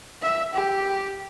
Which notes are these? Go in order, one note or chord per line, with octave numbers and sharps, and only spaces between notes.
E5
G4